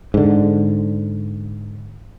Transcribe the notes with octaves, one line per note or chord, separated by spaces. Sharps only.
G#2 D3